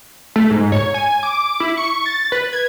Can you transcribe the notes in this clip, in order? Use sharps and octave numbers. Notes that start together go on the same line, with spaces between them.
A3
G#2
C#5
G#5
D6
E4
C#6
A6
B4
G#6